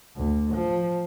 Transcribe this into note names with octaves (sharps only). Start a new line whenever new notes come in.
D2
F3